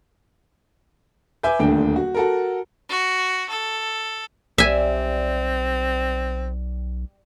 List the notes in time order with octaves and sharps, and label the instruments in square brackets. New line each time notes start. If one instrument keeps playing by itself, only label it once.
[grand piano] B4 E5 G#5 D6 G6
D#1 D2 D3 G5
F#4
F#4 A4 A#4
[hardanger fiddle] F#4
A4
[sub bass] B1 [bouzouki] G3 [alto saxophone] C4 [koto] E5 G#5